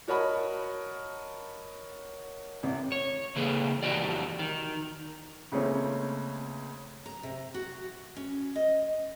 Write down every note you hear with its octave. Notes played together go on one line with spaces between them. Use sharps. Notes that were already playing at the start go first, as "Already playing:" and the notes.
F#4 A#4 C#5 D#5 A5 B5
A1 C3
C#5
C#3 E3 A3 A#3 G#4 B4
F2 E3 D4 F#4 G4 D5
D#3
C#2 C#3 A3 A#3 C4 C#4
A#5
C3
F#4
C#4
D#5